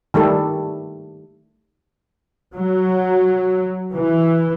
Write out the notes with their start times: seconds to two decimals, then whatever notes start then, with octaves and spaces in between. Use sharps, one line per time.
0.14 D#3 G3 A3 A4
2.54 F#3
3.94 E3